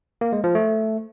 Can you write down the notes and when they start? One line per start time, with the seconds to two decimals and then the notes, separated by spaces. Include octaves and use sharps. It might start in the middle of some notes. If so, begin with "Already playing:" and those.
0.21 A#3
0.33 G#3
0.44 F3
0.55 A3